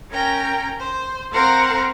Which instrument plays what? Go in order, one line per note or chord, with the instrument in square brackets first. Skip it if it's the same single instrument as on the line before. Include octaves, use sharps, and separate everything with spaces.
[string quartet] C#4 A#4 G5 A#5
C5
C4 A#4 C5 F5 F#5 A#5